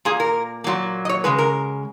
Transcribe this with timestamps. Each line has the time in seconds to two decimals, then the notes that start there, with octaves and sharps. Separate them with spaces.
0.05 A#2 A#3 G#4
0.20 A#4
0.64 A#2 F#3 A#3
1.05 D#5
1.09 C#5
1.24 C#3 G#3 B4
1.38 A#4